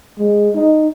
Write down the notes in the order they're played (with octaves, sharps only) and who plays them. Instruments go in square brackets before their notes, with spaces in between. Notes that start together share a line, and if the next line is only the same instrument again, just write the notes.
[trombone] G#3
D#4